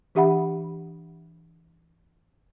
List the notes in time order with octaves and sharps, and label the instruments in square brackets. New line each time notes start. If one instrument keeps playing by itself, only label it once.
[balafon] E3 D4 G4 E5 F#5 B5